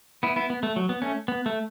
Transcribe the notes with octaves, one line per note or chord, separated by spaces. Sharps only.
B3 E4
B3 E4
B3
A3
F#3
B3
A3 C#4
B3
A3